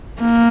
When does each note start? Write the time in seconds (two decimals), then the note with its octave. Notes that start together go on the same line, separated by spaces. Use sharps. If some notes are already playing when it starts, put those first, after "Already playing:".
0.20 A#3